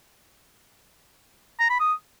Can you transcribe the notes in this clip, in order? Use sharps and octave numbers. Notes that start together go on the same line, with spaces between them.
A#5
B5
D#6